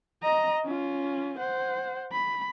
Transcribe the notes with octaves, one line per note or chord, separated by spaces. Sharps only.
D#5 A#5
C#4 F4
C5 F#5
B5